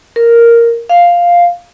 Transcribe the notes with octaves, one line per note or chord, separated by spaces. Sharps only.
A#4
F5